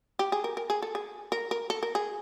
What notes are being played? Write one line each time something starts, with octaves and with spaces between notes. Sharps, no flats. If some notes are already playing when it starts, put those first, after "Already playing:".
G4
G#4
A#4
A#4
G#4
A4
G#4
A#4
A#4
A4
A#4
G#4